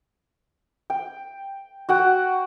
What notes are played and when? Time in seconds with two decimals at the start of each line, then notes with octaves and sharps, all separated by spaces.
0.90 G5
1.89 F#4 F#5 G5